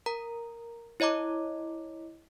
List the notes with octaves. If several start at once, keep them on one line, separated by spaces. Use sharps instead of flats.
A#4 A#5
E4 C#5 D#5 A#5 D6